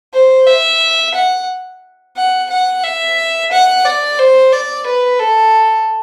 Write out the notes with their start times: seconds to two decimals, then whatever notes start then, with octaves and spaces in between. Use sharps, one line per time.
0.14 C5
0.47 E5
1.14 F#5
2.16 F#5
2.50 F#5
2.84 E5
3.52 F#5
3.85 D5
4.18 C5
4.52 D5
4.86 B4
5.19 A4